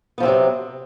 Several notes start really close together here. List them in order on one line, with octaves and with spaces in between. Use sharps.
B3 F3 C4 C3 F#3